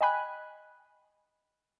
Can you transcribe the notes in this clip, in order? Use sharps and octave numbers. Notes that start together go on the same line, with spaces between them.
D#5 G5 G#5 B5 F#6